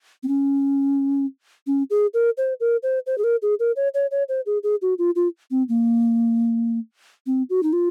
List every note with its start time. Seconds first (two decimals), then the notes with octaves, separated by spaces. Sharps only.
0.23 C4
0.28 C#4
1.67 C#4
1.90 G#4
2.14 A#4
2.38 C5
2.60 A#4
2.83 C5
3.07 C5
3.18 G#4
3.24 A#4
3.42 G#4
3.60 A#4
3.76 C#5
3.94 C#5
4.11 C#5
4.29 C5
4.46 G#4
4.63 G#4
4.82 F#4
4.98 F4
5.16 F4
5.51 C4
5.69 A#3
7.26 C4
7.50 F#4
7.63 D#4
7.73 F4